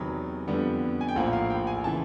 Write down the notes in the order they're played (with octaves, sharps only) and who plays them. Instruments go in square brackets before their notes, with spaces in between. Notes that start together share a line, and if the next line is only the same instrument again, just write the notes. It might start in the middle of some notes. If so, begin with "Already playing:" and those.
Already playing: [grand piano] E2 C3 D#3 F#3 B3 B5
F2 D3 G3 B3
G#5
G5
A#1 A2 F3 A#3 F#5
F5
G5
G#5
C#3 E3 A5